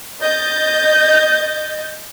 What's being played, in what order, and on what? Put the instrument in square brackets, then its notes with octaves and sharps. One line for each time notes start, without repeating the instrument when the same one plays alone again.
[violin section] D#5 G6 A6